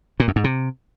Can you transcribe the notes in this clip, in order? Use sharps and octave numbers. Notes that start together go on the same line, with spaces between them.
A#2
F#2
G#2
C3